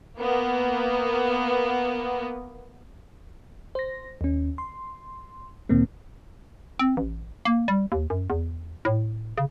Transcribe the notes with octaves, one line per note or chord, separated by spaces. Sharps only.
A#3 B3
C5 A#6
D#2 C#4
C6
D2 A#2 D#3 A#3 C4
C4
A1
A#3
G3
D#2
F#2
E2
A2
C#3